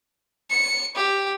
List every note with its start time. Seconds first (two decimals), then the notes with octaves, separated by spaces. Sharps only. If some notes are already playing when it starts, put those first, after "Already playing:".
0.50 C#7
0.95 G4